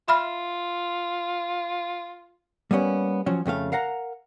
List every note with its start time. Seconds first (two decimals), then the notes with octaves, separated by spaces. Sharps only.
0.08 F4 E5 B5 F6
2.71 G3 A#3 B3 C#4
3.26 F3 F#3 C#4
3.46 F2 C#3 A3 F5
3.72 A#4 F5 F#5 A#5